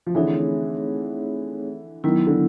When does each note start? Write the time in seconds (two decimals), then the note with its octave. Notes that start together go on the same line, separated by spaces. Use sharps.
0.07 F3
0.15 D3 E3 A3 C4 D#4 G#4 C#5
2.04 D#3 F#3 B3 E4
2.27 D3